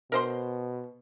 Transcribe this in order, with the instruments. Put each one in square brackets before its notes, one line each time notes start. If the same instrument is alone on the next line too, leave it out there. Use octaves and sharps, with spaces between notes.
[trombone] B2 [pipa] A#4 C5 C6